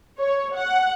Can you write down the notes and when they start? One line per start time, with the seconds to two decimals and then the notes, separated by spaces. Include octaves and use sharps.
0.19 C#5
0.56 F#5